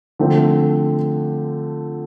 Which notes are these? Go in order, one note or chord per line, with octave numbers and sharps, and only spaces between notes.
D3 F3 A3 C4